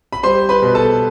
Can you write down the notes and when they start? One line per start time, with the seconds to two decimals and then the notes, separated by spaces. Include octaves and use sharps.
0.13 B5
0.23 G3 C5 C6
0.49 B4 B5
0.62 B2
0.74 A4 A5